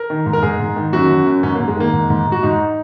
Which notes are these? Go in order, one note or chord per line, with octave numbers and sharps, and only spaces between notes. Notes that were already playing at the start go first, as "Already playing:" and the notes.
Already playing: A#4
D#3
G#2
A#4
G#2 G#4
G#2
D#3
F#2 F#4
F#2
F#2
G#2 C#4
A#3
G#2
G#3
D#3 A#3
G#2
G#2
G#2
F#4
G#2 D#4